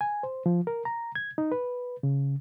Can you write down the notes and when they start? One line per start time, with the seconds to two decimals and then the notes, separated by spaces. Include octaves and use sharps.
0.01 G#5
0.23 C5
0.46 F3
0.67 A#4
0.85 A#5
1.15 G#6
1.38 D#4
1.52 B4
2.03 C#3